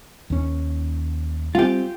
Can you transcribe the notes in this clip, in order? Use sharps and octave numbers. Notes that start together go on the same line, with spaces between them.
D#2 C#4
G3 A3 C4 F4 G4